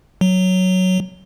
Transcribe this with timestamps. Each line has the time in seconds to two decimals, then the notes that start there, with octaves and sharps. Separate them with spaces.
0.21 F#3